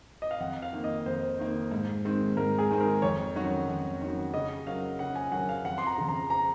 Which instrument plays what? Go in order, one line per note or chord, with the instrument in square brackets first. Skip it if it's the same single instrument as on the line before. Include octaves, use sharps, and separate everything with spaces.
[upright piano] D#5
F5
[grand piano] F2 [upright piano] F#5
[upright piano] F5
[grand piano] D#3 A#3
[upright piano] D#5
[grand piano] F2 [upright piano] C5
[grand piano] D#3 A#3
G#2
D#3 G#3 C4
[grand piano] G#2 [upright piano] A#4
[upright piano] G#4
[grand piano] D#3 G#3 C4
[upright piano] A#4
[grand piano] F2 [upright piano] C#5
[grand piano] D#3 F#3 C#4 F#4
F2
D#3 F#3 C#4 F#4
[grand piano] C#3 [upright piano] D#5
[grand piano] F#3 C#4 F#4 A#4 [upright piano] F5
[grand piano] C#3 [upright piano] F#5
[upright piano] G#5
[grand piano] F#3 C#4 F#4 A#4 [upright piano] F#5
[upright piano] F5
[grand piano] F2 [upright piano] F#5
[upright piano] C6
A#5
[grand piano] C#3 F3
[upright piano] A#5
A#5